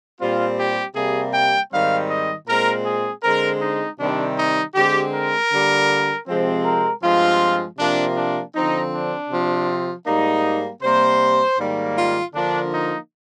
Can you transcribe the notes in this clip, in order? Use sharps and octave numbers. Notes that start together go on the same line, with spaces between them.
A#2 G3 C4 F4
G4
C3 G3 A#3 G#4
G5
G#2 D#3 G3 C4 F5
D#5
A#2 G#3 C4 A#4
G#4
D3 G#3 C4 A#4
D#4
C3 D#3 G3 C4 D4
D#4
D3 G#3 C4 G4
A#4
D3 G3 A#3
C3 F3 G#3 C4
A#4
G2 F3 G#3 C4 F4
C3 F3 A#3 D4
D4
D3 F3 C4 D#4
D4
C3 F3 C4
G#2 G3 A#3 D#4
C3 G3 A#3 C5
G#2 D#3 G3 A#3
F4
D3 F3 A#3 D4
D#4